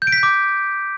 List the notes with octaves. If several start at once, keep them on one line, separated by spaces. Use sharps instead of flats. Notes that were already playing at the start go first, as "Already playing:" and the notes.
G6
D7
B6
G6
D6